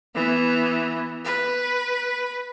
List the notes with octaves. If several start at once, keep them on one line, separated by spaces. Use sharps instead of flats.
E3 B3
B4